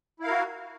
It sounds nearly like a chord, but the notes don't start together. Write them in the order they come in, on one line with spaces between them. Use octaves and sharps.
E4 F5 A#4 F#4